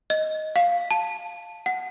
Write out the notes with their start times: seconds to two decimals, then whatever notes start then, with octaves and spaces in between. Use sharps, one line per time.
0.10 D#5
0.56 F5
0.91 A5
1.66 F#5